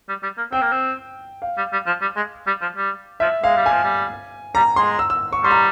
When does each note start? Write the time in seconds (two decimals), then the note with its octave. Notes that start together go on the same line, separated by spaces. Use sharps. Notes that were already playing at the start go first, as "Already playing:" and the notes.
0.08 G3
0.23 G3
0.37 A#3
0.52 C4 G5
0.62 A#3
0.71 C4
1.42 F5
1.57 G3
1.72 G3
1.86 F3
2.01 G3
2.16 G#3
2.47 G3
2.61 F3
2.76 G3
3.20 F3 E5
3.43 G#3 F5
3.57 G3
3.66 F3 G#5
3.84 G3
4.55 G3 A#5
4.76 G#3 C6
4.99 E6
5.10 E6
5.33 C#6
5.44 G3 C6
5.51 A#5